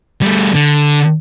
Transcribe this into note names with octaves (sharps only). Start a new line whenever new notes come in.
G3 A3
D3